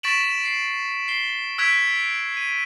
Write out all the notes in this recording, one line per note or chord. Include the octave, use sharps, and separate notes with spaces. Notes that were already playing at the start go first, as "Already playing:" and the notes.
C#6 A6 B6 D7 E7 F#7
C7
C7 G7
E6 F#6 G#6 B6 D7 F7
D#7